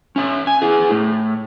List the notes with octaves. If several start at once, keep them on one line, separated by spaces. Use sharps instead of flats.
C#4 E5
G#5
E4 G#4
A2